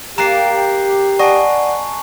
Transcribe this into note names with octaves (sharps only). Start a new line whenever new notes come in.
A#3 G4 D5 A#5 F#6 C7
D5 D#5 F#5 G#5 A5 C#6